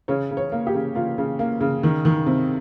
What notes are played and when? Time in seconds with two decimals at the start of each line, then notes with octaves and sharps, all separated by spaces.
0.08 C#3 C#5
0.31 C#3
0.37 C#5
0.52 A#3
0.67 G4
0.74 C#3
0.95 A#3 F4
1.18 C#3
1.39 A#3
1.61 C#3
1.83 D#3
2.05 D#3
2.27 C3